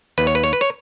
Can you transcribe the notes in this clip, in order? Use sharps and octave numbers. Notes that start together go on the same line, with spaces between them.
D#2 B4
C#5
B4
C#5
B4
C#5